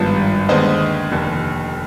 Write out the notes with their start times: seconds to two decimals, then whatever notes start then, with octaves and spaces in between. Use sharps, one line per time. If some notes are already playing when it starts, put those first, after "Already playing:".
Already playing: G#1 G2 F3 B3
0.48 D#2 D3 G#3 B3 C5 D#5
1.11 F1 D#2 D3